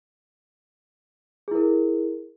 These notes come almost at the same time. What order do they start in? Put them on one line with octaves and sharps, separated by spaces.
G#4 E4 A#4